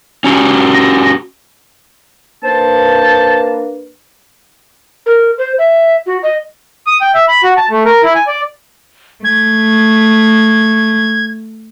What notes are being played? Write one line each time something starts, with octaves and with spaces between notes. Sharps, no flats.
C#4 F#4 G4
A#6
A#3 D4 B4 C5 A5
A#4
C5
E5
F#4
D#5
D#6
G5
E5
B5
F#4
A5
A3
A#4
E4
G#5
D5
A3 G#6